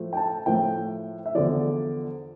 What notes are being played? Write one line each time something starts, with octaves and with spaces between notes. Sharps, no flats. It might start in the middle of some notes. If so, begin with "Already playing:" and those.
Already playing: A2 F3 A3
G5
A5
A2 F3 A3 G5
E5
E2 D3 F3 D5